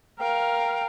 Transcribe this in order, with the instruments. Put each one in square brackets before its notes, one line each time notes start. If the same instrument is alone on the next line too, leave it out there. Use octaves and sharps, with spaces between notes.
[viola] A#4 F5 [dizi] G5